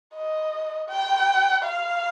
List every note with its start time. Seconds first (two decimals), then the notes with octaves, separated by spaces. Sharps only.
0.15 D#5
0.89 G5
1.63 F5